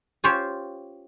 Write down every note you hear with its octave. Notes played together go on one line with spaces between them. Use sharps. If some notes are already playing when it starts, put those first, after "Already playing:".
C#4 F4 G4 C5 C#5